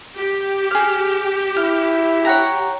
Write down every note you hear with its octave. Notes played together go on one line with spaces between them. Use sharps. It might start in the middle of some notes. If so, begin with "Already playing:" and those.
G4
G#4 F6
E4 F6
C#5 F#5 G5 A#5